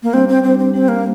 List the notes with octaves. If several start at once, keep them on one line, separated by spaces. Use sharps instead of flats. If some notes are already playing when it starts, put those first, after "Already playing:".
A#3
G3 C4 D4 G4
C4
G3 C4 D4 G4
C4
G3 C4 D4 G4
A#3